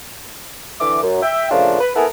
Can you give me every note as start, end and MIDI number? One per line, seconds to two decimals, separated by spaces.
0.80 1.01 50
0.80 1.01 52
0.80 1.01 76
0.80 1.01 86
1.02 1.20 42
1.22 1.51 76
1.22 1.51 79
1.51 1.77 46
1.51 1.77 49
1.51 1.77 53
1.51 1.77 57
1.51 1.77 62
1.51 1.77 65
1.80 1.91 71
1.96 2.06 59
1.96 2.06 64
1.96 2.06 69
1.96 2.06 70
1.96 2.06 78
1.96 2.06 80